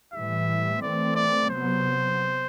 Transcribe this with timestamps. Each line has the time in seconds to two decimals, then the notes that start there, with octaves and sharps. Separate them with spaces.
0.14 A2 E3 G3 E5
0.82 E3 A3 C4 D5
1.16 D5
1.50 C3 F#3 B3 C5